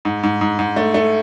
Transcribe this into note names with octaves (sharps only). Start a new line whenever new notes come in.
G#2
G#2
G#2
G#2
A3
A3